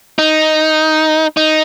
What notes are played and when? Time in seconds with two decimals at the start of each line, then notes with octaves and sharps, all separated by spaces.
0.19 D#4
1.37 D#4